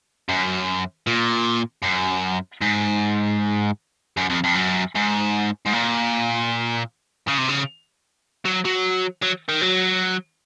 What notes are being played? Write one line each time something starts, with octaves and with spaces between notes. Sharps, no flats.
F#2
A#2
F#2
G#2
F#2
F2
F2
F#2
G#2
G#2
A#2
C#3
C3
C#3
F#3
F#3
F#3
D#3
F#3